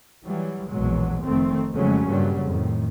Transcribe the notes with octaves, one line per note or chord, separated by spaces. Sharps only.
E3 F#3 G3
A#1 E2 B2 F#3 G#3
F1 F2 D#3 A3 C4
F2 C#3 F#3 G#3 A3 C#4
G2 A#2 C#3 F#3 G3
F2 A2 D#3